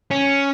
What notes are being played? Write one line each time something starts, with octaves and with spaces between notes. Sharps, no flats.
C#4